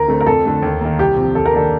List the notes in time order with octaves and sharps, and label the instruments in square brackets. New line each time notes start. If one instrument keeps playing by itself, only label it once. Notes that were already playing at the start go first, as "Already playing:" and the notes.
Already playing: [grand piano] D2 [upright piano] A#4
[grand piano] D3 A3 C4
[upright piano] A#4
[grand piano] F2 [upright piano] A4
[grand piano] D3 A3
D#2
D#3 A#3
[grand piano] C2 [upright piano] G4
[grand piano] C3 F3
[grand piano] D#2 [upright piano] A4
[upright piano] A#4
[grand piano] D#3 A#3 D4 [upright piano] A4